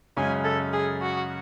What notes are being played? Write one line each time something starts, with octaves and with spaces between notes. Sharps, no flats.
F#2 C#3 G#3 C#4 G#5
A4
G#4
F#4